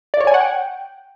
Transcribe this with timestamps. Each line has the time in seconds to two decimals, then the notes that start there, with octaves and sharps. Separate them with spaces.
0.14 D5
0.20 C#5
0.27 G#5
0.34 F#5
0.41 G5